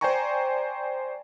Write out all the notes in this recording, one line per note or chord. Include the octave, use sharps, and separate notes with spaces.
C5 D5 G5 G#5 A#5 C#6